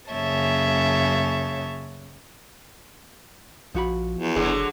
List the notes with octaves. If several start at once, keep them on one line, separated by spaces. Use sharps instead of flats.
F#2 C#3 A#3 C#5 E5 A5
A#1 F3 F#4 B5
E2
F#1 D3 F#3 G#4